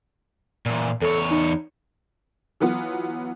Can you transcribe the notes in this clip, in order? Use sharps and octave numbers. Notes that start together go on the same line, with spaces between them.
A#2 E3
E2 A4 C#5
D#4
E3 F#3 B3 F4